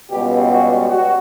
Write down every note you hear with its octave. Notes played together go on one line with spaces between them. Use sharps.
C#2 B2 G3 B3 G4
F#4
F#4